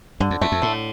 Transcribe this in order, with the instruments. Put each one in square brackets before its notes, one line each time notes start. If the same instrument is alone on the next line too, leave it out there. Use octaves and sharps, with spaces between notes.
[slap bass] G2 [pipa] D3
[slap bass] F2
[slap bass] E2 [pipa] A3
[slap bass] F2
[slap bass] A2 [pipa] D3